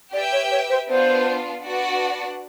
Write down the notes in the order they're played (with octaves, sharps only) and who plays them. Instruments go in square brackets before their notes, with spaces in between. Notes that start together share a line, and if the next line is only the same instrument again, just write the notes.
[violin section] G4 B4 E5 G5 [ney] D5
[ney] C#5
C#5
C5
[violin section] B3 D4 F4 [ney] C5
[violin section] D4 F#4 B4 D5 F#5